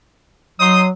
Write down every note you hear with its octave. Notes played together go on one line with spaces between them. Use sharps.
F#3 D#4 C6 D#6